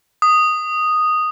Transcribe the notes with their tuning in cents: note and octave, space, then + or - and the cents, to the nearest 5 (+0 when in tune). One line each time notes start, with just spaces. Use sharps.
D#6 -5